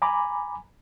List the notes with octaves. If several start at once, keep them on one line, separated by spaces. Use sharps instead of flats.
G#5 A#5 B5 D6